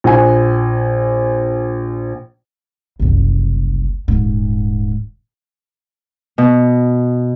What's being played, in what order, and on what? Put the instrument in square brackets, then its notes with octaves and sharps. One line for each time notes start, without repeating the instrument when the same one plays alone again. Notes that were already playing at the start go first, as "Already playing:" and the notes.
[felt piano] A#1 G#5
[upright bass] F#1 C2
D#1 G#2
[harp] B2